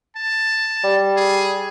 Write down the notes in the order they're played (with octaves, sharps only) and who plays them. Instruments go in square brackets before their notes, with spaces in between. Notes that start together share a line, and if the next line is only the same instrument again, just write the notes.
[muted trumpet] A5
[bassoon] G3
[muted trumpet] G#4